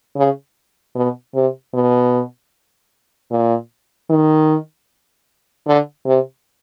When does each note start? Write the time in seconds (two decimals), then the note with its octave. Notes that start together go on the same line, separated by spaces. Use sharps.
0.16 C#3
0.96 B2
1.35 C3
1.74 B2
3.31 A#2
4.10 D#3
5.67 D3
6.06 C3